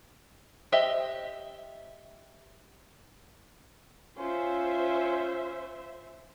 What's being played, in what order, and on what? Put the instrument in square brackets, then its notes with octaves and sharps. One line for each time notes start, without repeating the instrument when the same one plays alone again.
[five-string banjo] G4 C5 D#5 E5
[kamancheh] C#4 F4 [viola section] C5 E5